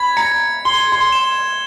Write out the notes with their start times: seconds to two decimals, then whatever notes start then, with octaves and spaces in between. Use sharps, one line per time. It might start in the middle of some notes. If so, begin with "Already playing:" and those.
Already playing: B5 G#6
0.17 A#5 C#7
0.65 C6 G7
0.92 C6
1.12 E7